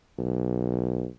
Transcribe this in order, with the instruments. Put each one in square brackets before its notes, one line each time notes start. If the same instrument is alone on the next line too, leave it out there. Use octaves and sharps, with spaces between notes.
[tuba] B1